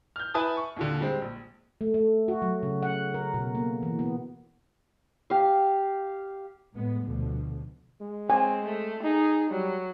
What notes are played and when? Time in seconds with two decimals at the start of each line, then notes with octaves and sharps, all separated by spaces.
0.16 F6 G6
0.34 E4 B4 G#5 A5 D#6
0.57 C#6
0.76 D#2 A#2 D3
1.01 G3 G#3 C4
1.22 A#1
1.81 A3
1.94 A3
2.28 F#4
2.42 F#3
2.63 C#3
2.83 F#5
3.14 A#4
3.34 B2
3.55 A#3
3.83 E3
3.99 B3
5.30 G4 F5
6.73 A2 G#3 B3
7.06 D2 B2 D3 F3
8.01 G#3
8.30 C4 G#5
8.65 A3
9.04 D#4 G#4
9.50 F#3 G3